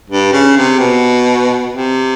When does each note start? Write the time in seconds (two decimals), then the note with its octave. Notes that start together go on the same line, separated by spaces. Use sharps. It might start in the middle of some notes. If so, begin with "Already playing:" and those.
0.10 G2
0.33 C#3
0.57 C3
0.80 B2
1.72 C3